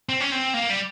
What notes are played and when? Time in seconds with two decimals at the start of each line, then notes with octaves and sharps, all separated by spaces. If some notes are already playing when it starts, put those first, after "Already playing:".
0.09 C4
0.20 C#4
0.32 C4
0.54 A#3
0.70 G3